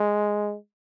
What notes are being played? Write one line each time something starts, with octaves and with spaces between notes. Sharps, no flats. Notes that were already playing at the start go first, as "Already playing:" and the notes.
Already playing: G#3